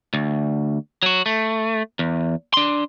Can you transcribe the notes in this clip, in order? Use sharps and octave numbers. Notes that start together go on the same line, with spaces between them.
D2
F#3 F#4
A3
E2
D4 C6